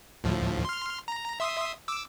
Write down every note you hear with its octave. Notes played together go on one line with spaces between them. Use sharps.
D2 A2 F3
C6 F6
A#5
E5 C6 D#6
D6 E6